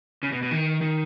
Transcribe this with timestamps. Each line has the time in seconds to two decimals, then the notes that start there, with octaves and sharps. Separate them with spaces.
0.23 C#3
0.32 B2
0.42 B2
0.51 D#3
0.81 D#3